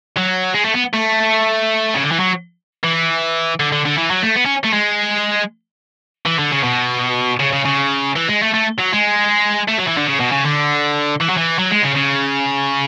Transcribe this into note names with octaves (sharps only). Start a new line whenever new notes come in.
F#3
G#3
A3
B3
A3
C#3
D3
E3
F#3
E3
D3
D3
D3
E3
F#3
A3
B3
C#4
A3
G#3
E3
D3
C#3
B2
C#3
C#3
C#3
E3
G#3
A3
A3
F#3
G#3
A3
F#3
E3
D3
C#3
B2
C#3
D3
E3
F#3
E3
F#3
G#3
C#3
C#3